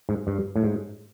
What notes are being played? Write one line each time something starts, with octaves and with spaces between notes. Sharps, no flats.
G#2
G2
A2
G#2